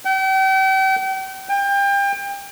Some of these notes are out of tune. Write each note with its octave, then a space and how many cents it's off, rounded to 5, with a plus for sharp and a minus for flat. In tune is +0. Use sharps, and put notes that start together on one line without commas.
G5 -40
G5 +30